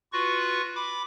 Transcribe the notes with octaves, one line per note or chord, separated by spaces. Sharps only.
F4 F#4 B4 C#6
B5 D6